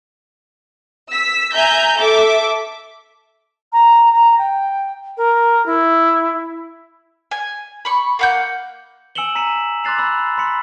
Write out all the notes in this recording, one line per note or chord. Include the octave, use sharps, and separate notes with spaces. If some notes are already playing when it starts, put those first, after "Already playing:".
E6 B6
E5 G#5 A#5 G6
A4 E5 D6
A#5
A#5
G5
A#4
E4
G#5
B5 C#6
A#3 F#5 G6
G#5 E6 C#7 E7 F#7 G7
A#5 B6 C#7 D#7 E7
C6 D6 F#6 A6 C7 F7
B5 E6
B5 C6 B6 C#7